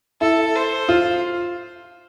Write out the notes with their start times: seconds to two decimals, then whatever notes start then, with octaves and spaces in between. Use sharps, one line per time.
0.21 E4 A4
0.55 C5
0.89 F4